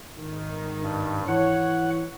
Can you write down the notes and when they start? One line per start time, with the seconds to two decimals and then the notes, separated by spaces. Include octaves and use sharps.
0.13 G#1 D#3
0.83 G2
1.28 E3 C#5 F#5